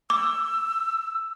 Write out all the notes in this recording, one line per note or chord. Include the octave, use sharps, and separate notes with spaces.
D6 E6